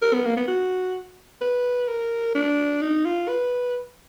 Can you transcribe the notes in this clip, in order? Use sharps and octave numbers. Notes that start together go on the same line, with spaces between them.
A#4
B3
A#3
B3
F#4
B4
A#4
D4
D#4
F4
B4